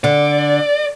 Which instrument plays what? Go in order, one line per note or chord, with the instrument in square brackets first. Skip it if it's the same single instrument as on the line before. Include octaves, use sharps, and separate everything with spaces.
[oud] D3 [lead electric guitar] D5